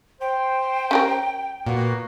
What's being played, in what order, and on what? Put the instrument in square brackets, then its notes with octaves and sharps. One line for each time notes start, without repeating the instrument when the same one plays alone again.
[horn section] C5 [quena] G5
[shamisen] C#4 G4 A#4
[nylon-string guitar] A#2 [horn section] A#3 B3 F#4